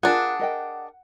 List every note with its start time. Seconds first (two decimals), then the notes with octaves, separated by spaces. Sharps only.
0.03 D4 F4 G#4 A#4 F#5 A5
0.39 A#4 D#5 G5